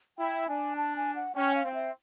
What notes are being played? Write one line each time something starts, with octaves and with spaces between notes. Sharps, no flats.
E4 G5
D4 G#5
A5
G#5
F#5
C#4 G5
F5
C4
E5